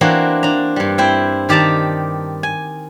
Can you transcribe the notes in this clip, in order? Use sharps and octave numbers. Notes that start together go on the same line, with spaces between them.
E3 A#3 C4 D4 F#4
D4 A#5
G2 G3
C4 E4 G5
D#3 G4 D5 A5 A#5
G#5